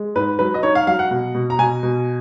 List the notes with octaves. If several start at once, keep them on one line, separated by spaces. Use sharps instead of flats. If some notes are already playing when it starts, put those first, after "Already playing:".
Already playing: G#3
G#2 B4
F#3 B4
D#5
D#4 C#5
F5
F#3 F5
F#5
B2
B2
A#5
B2 G#5
B2